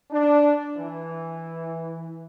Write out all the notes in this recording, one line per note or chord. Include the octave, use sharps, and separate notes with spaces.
D4
E3